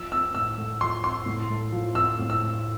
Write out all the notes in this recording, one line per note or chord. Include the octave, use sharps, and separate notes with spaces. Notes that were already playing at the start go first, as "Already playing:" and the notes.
Already playing: F3 E6
C4 E6
A2 E6
A3
F3 C6
C4 C6
A2
A3
F3
C4 E6
A2
E6
A3